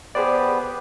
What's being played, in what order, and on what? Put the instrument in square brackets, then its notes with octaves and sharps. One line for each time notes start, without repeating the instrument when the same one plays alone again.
[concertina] B3 G4 B4 [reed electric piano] G#4 C5 D5